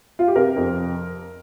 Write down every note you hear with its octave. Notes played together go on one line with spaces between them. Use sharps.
F4
G4
C3 A#4
F2